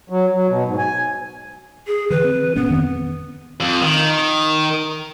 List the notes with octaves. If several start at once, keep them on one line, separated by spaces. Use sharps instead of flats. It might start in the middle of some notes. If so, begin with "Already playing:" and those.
F#3
F#3
B2
G#2
G#5
G#4
D3 E3 B4
C4
G1 A#2 B3 C#4
F2 D#3 C4
F2
D#3